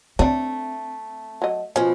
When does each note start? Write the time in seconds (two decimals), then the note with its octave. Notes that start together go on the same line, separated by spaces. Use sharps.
0.19 A3 C4 D4 C#5
1.42 F#3 D#5
1.76 B2 F3 C#4